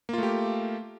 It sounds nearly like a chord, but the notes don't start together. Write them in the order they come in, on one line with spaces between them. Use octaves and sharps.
A#3 F4 A3 G4